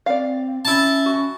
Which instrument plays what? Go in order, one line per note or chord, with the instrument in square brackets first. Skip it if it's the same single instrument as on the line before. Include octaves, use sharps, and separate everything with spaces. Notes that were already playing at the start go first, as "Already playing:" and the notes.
[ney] C4 [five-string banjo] D5 F5
[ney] C#4 [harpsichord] E4 A5
[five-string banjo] F#4